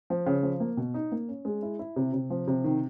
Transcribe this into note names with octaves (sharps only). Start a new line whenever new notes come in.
F3
C#3
F3
A#3
B2
D#4
A#3
C#4
G#3
E4
E4
C3
C3
F3
C3
D#3